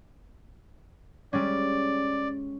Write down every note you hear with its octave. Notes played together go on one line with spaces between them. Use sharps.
G3 G#3 C#4 D5